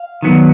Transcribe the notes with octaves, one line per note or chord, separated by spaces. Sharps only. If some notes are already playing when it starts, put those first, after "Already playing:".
Already playing: F5
D#3 F#3 B3